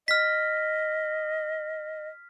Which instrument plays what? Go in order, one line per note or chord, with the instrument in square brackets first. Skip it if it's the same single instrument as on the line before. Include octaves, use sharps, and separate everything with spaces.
[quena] D#5 [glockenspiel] F6 B6